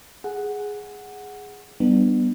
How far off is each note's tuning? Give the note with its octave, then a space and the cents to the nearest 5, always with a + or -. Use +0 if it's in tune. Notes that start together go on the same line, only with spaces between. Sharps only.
G#4 +0 F#5 +0
G3 -15 B3 +0 D4 +30